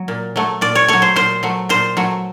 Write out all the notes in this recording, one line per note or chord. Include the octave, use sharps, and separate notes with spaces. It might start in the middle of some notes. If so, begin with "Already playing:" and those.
Already playing: F#3
A#2
F#3 A3
A#2 D5
C#5
F#3 A3 C#5
C5
A#2 C5
F#3 A3
A#2 C5
F#3 A3